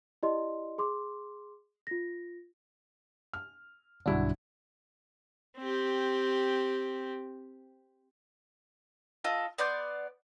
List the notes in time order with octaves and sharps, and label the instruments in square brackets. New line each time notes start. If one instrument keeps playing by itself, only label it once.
[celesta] E4 G4 D5 D#5 C6
G#4 C6 D6
F4 A#6
[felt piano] F6
[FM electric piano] B1 G2 D4 [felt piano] D3 E4 F#4
[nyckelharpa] C4 G4
[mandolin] F4 A4 D#5
B3 D5 C6 G6